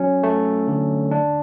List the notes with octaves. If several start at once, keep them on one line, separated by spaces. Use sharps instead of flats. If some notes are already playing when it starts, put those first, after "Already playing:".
Already playing: F#3 C#4
A3
D3
D4